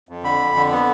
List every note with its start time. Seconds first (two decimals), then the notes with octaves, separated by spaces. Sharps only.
0.09 F2
0.23 D3 B5
0.40 F2
0.56 D3
0.72 B3